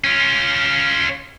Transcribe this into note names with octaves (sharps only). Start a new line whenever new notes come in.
C#4 F4